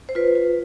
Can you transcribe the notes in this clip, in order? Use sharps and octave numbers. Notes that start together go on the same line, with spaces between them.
C5
F4 B4
F4